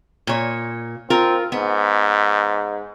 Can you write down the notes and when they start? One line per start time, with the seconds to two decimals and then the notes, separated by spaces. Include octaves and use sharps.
0.27 A#2 C#5
1.10 C4 F4 A#4
1.52 G#2 B3